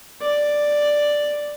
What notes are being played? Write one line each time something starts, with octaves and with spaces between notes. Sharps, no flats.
D5